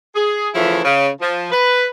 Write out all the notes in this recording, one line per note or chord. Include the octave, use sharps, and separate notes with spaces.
G#4
C#3 E3 F3 A3 E4
C#3
F3
B4